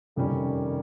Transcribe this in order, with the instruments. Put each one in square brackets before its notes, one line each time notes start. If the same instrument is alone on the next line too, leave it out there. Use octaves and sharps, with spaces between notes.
[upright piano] F2 C3 G3 C#4 [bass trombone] D#3